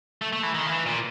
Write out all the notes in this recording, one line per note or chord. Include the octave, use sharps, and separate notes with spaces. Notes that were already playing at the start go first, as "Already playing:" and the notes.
A3
A3
E3
D#3
F3
E3
A#2